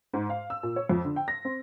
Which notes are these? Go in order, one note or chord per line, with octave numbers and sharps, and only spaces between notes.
G#2
F5
E6
A#2
C#5
F2
D3
G5
A#6
C4